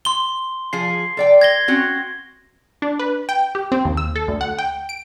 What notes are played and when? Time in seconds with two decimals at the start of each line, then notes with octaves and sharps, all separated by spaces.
0.05 C6 G7
0.73 F3 G#4 C7
1.17 A4 D5 G5
1.41 G#6 A#6 G7
1.68 C4 C#4 F#4
2.82 D4
2.99 B4
3.29 G5
3.55 G4
3.72 C4
3.85 D#2
3.97 E6
4.16 A4
4.28 D2
4.41 F#5
4.59 G5
4.89 D7